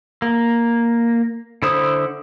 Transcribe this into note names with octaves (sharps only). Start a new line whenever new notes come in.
A#3
D3 E4 C5 D#6